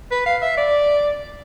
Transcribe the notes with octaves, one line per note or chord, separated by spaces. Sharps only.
B4
F5
E5
D5